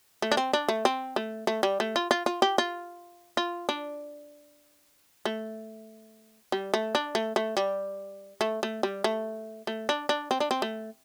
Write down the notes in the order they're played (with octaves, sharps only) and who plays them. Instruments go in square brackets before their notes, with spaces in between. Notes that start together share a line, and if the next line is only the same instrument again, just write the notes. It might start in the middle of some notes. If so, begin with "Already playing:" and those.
[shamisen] A3
D4
C4
D4
A3
C4
A3
A3
G3
A3
F4
F4
F4
G4
F4
F4
D4
A3
G3
A3
D4
A3
A3
G3
A3
A3
G3
A3
A3
D4
D4
C4
D4
C4
A3